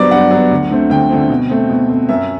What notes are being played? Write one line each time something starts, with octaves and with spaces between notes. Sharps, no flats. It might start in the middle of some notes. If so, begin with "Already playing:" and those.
Already playing: G2 F#3 B3 C5 D5
G2 F#5
F#3
B3
D2
D3 A3 C4
D2 G5
D3 A3 C4
B2
A3 C4
B2
A3 C4
F#2 E5